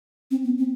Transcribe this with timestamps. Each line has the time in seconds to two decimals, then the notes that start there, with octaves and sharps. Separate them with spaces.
0.31 C4
0.45 B3
0.58 C4